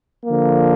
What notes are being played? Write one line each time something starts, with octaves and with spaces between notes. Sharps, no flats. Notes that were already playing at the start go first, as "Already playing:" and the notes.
D3 F3 A#3